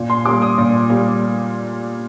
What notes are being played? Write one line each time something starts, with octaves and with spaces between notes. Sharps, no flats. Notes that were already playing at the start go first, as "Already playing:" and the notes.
Already playing: A#2
C6
G3 A#3 D6
D#6
A#2
G3 A#3